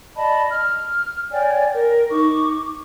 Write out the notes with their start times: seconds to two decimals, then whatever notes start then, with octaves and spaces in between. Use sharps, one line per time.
0.17 D5 D#5 A5 B5
0.50 F6
1.31 C#5 D5 G5 G#5
1.74 A#4
2.11 D#4 C#6 D6